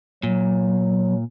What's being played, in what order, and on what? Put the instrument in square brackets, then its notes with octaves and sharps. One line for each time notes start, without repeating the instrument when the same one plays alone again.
[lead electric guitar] A#2 [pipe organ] F#3